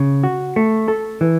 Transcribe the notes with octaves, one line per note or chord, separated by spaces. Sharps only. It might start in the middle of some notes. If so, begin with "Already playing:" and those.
Already playing: C#3
F#4
A3
A4
E3